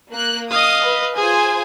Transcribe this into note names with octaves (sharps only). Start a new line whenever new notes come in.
A#3 F#6
D#5 F5 D#6
B4
F4 G#4 C5 G#5